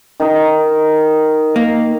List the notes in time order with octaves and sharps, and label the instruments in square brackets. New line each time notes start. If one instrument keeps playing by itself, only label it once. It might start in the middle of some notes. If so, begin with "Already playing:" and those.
[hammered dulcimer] D#3 D#4 A#4
[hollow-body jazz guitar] A#3